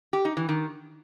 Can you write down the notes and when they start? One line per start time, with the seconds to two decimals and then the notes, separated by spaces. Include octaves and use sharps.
0.13 G4
0.25 D#4
0.37 E3
0.49 D#3